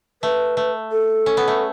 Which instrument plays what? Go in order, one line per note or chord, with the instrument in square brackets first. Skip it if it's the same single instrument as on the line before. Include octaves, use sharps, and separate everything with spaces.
[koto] A3 [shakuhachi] B4
[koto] A3
[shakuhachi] A4
[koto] C#4
B3
A3